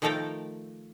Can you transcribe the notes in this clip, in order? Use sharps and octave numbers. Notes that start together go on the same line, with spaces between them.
D#3 F3 A3 A4 A#4 G5